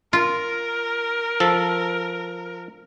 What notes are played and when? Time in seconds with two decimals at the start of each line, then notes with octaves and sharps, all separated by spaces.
0.13 F4 A#4
1.40 F3 A4